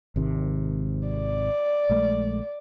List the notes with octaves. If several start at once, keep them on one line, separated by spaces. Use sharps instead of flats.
G#1 C3 D#3
D5
A#1 G#3 A3